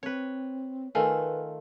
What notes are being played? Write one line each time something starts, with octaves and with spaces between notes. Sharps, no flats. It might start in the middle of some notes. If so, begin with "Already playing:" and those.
C4 B4 C#5
D#3 A3 F4 A4 B4 G#5